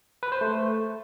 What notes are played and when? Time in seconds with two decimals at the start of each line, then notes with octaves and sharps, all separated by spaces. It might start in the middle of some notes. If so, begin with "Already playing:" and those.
0.23 B4
0.32 C5
0.41 A3